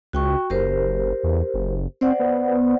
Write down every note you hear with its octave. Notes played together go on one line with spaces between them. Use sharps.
C#2 F#4 G5 C#6
F#1 G4 A#4 C5
E2
F#1
C4 C5 D5 F#5
B3